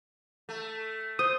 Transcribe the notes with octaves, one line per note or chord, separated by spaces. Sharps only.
A3
C5 D#6